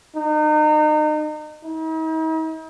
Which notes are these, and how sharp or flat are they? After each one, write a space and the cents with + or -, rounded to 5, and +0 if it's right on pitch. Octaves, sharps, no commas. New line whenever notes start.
D#4 -35
D#4 +45